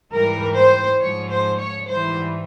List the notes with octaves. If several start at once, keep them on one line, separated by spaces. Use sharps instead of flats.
G#2 E3 G3 A#4
C5
G#2 F3 G#3 C#5
C5
C#5
G#2 E3 G3 C5